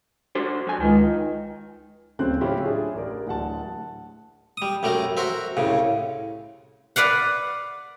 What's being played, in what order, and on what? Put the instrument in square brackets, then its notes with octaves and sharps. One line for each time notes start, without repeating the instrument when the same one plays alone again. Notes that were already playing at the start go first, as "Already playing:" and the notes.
[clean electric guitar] D4 F#4 C5
F2 G#5
[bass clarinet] C#2 [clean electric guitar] D#3
[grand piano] D1 C#3 A3 C4 F#6
A2 C#3 C#4 E4 F4 G4
D4 G#4
A1 A#4 D5
D1 D2 F#5 A5
[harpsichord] G3 D#6
F#2 G3 A3 A#4
F#4 A#4 C5 E5
C2 A2 C#3
[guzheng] B4 D5 F5 F#5